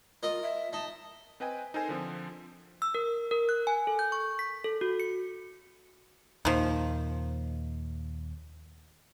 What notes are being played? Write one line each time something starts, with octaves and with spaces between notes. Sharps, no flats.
F4 A#4 D#5
E5
D#4 A5
C4 B4 D#5 G5 G#5
D#4 A4 A#4 C5 G#5
D3 F3 C4
E6
A#4
A#4
F#6
G#5
A4
G6
C#6
B6
A4
F#4
C#7
D#2 A#2 D#3 F3